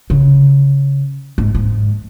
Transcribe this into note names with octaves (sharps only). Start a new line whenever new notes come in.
C#3
G#2
G#2